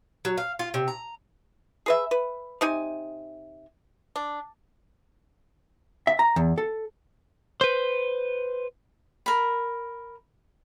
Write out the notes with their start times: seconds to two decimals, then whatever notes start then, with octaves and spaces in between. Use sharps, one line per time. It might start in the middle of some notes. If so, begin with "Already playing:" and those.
0.25 F#3
0.38 F5
0.59 F4
0.74 C3
0.88 A#5
1.86 G#4 B4 E5
2.11 B4
2.61 C3 D#4 G#5
4.16 D4
6.07 E5
6.19 A#5
6.36 E2
6.58 A4
7.61 B4 C5
9.26 A#4 B5